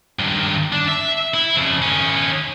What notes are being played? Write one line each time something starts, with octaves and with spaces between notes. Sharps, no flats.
G2 D#3
D4
E5
E4
F2 C#3
D#3 C#4